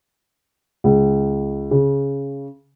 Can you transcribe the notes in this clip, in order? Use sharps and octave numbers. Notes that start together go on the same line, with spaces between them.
C#2
C#3